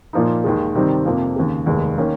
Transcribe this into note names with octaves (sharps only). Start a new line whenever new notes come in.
A#2 F3 A#3 D#4
D#2 D#3 G#3
C3 D#3 G3 C4 D#4
F2 C3 F3 A#3
D#2 C#3 G#3
F1 D#2 D#3 G#3
D#3 A#3 C#4